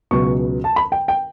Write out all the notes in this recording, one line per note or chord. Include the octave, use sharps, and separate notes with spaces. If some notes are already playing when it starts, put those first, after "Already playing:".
C#2 B2 F#3 B3 C#6
A5
B5
G5
G5